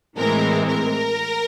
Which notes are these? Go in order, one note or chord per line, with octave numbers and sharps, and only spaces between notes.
A2 E3 G#3 C4 A#4
A#4